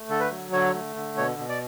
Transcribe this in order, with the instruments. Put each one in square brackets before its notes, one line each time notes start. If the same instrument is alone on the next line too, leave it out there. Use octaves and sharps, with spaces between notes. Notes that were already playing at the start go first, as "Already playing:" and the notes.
Already playing: [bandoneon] A3
D3 A4
B4
F#3
D3 C#5
A3
D3
B2 C#5
B2
D5